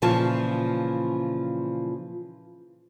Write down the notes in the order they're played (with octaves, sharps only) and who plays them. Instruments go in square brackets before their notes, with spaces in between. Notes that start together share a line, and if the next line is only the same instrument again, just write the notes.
[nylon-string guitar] A#2 C#3 E3 F3 F4 A5